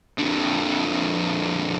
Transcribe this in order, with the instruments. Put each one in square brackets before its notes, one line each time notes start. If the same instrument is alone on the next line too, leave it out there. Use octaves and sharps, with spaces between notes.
[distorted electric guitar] F2 D3